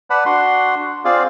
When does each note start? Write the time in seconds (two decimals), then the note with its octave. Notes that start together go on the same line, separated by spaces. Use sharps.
0.10 B4 D5 F#5 A5 B5
0.26 D4 F#4 F#5 C6
1.05 C4 F4 G#4 D5 F5